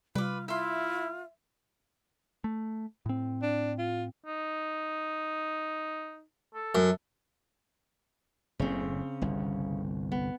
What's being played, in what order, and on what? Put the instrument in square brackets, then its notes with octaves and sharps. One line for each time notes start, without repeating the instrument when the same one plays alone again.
[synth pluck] C3 G3 [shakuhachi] F4 [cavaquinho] B4 D6
[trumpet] E4 [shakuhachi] F4 [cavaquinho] E5 C6
[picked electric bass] A3
A2 C4
[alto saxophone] D4
F4
[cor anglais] D#4
A4
[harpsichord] F#2
[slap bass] F#1 A2 [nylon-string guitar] C#3 C4
[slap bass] G1 C2
[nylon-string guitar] B3